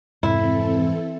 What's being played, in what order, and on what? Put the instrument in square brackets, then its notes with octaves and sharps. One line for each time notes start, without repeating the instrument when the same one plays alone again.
[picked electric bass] F2 G#2 C3 [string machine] E3 C4 A4 [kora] E4